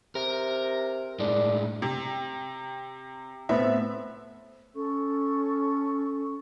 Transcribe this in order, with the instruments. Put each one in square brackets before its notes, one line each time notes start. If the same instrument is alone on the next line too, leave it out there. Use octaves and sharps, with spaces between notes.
[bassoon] C3 [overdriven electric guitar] A#4
[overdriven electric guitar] A2 G#3 [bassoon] D4
[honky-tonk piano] C3
[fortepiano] A2 B3 C4 [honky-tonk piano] E5
[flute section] C#4 A4 C#6